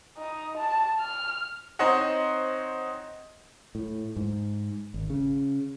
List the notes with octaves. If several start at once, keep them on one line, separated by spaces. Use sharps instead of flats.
D#4
A5
F6
C4 D#4 C5 C#5 D#5 F#5
A2
G#2
G#1
C#3